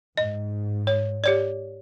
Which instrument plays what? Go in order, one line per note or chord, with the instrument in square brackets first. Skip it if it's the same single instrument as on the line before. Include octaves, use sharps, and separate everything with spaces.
[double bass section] G#2 [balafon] D#5
[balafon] C#5
G4 C#5 D5